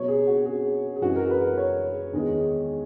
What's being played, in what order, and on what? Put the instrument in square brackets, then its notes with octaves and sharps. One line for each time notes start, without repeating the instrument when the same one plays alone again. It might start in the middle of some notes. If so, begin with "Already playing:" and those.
Already playing: [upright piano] B2 F#3 C#5
G#4
F#4
G#4
G#4
F#2 E3 G#3 F#4
A#4
B4
A#4
C#5
E2 D#3 G#3